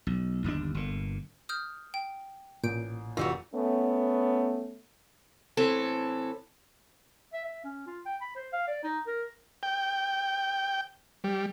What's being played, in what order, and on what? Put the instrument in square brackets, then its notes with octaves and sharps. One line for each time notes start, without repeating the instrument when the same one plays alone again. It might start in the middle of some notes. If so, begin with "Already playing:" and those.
[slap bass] B1
G1 D#2 C3 D4
G1 A#2
[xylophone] D#6 F6 G6
G5
[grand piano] A1 [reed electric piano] A#2 [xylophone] G6 D7
[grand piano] F1 E6 [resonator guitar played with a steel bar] E3 G3 F#4 [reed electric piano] F4
[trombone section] A3 B3 C#4
[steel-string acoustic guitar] A2 E3 C4 A4
[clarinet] E5
E5
C#4
F4
G5
B5
C5
F5
D5
D#4
A#4
[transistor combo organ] G5
G3